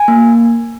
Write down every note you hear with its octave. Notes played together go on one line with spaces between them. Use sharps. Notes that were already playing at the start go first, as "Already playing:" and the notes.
Already playing: G#5
A#3